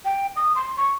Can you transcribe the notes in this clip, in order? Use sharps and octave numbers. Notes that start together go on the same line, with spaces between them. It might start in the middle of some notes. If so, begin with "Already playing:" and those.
G5
D#6
C6
C#6